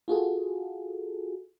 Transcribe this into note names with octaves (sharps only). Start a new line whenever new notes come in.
F4 F#4 G#4 A4